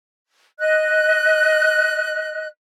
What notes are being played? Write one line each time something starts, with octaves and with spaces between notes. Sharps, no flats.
D#5 F#6